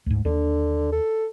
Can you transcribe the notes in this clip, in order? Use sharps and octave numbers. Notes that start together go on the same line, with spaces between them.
D2 G#2
D#2 D3 D4
A4